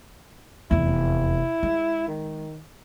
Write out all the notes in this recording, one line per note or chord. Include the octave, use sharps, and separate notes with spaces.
F1 E2 E4
G#3
D#3